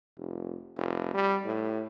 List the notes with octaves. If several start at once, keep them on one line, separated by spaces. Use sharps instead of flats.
F1
F1
G3
A2